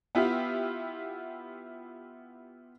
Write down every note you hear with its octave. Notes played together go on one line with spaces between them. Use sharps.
B3 E4 F4 G4